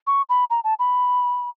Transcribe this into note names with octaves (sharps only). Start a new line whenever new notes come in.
C#6
B5
A#5
A5
B5